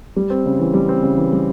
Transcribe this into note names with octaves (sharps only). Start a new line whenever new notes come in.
G3
C4
C#3
E3
G3
C4
C#3
E3
G3